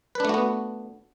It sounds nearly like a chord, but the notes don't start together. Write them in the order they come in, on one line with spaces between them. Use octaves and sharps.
B4 D4 A3 F#4 B3